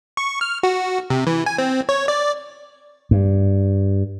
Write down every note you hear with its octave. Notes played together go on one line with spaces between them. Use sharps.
C#6
F6
F#4
C3
E3
G#5
C4
C#5
D5
G2